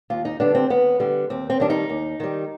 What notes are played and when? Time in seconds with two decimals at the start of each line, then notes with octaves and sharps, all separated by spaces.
0.10 D#2 F4
0.25 D#4
0.40 D3 G3 B3 D4
0.55 C4
0.70 D#2 B3
1.00 D3 G3 B3
1.30 D#2 C4
1.50 C4
1.60 D#3 G3 D4
1.70 D#4
1.89 D#2
2.20 D#3 G3